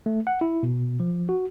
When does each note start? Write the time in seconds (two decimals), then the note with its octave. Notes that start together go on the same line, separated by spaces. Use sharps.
0.06 A3
0.27 F#5
0.41 E4
0.63 B2
1.00 F3
1.29 F#4